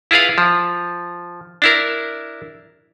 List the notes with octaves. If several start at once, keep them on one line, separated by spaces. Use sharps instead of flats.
E4 F4 G#4 B4 F5
F3
D4 E4 A#4